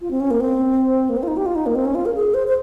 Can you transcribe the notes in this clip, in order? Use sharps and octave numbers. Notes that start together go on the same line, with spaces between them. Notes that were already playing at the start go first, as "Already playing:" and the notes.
F4
C4
C#4
A#3
C4
A#3
C4
F4
D#4
G4
F4
D#4
A#3
C4
C#4
F4
A#4
G#4
C5
C5